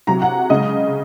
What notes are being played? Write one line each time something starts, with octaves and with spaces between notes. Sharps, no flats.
C3 F#3 A#5
F#5
C#3 G#3 D#5